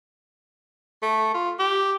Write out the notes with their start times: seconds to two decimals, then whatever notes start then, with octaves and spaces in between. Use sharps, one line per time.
1.02 A3
1.34 F4
1.59 G4